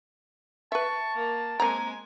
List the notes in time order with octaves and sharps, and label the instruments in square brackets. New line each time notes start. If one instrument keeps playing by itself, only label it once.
[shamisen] B4 E5 [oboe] A5 [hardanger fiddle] C#6
[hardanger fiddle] A#3
[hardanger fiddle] G#3 G#5 [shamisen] A#3 C4 A#5